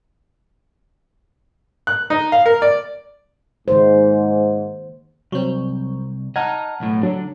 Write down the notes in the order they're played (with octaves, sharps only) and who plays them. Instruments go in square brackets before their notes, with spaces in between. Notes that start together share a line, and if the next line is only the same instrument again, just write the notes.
[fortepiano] F#6
D#4
F5
A#4
D5
[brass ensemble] G#2 [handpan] D#3 A#3 C5
[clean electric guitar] C2 [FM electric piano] F#3 C4
[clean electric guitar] D#5 A#5 [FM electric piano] F#5 [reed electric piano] A5 F6 G#6
[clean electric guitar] B1 A2
[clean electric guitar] D3 D4 [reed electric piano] F#3